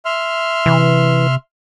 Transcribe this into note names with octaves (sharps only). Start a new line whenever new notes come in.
E5 C6 F6
C3 E3